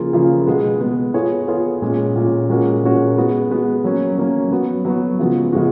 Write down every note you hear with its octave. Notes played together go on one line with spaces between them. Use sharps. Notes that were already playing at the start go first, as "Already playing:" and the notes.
Already playing: C#3 F3 A#3 F4 G#4
C#3 F3 A#3 F4 G#4
B2 G#3 B3
B2 G#3 B3
B3 F4 G#4 C#5
B3 F4 G#4 C#5
A#2 G#3 C#4
A#2 G#3 C#4
A#2 G#3 C#4 F#4 A#4
A#2 G#3 C#4 F#4 A#4
G#3 B3 F#4
G#3 B3 F#4
F#3 A#3 C#4
F#3 A#3 C#4
F#3 B3 F#4
F#3 B3 F#4
C#3 F3 G#3 B3 F#4
C#3 F3 G#3 B3 F#4